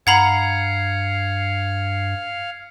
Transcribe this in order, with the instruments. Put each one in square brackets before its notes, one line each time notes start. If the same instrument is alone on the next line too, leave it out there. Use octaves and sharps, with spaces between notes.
[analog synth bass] G2 [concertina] F5 [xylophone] F#5 A#5 B5 [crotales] G#6 C7 C#7